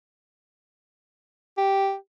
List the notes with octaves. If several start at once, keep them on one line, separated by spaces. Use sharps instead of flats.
G4